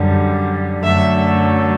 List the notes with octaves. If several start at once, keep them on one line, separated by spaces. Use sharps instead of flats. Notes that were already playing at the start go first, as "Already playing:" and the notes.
Already playing: F#2 D3 G3
F#2 D3 F#3 A3 E5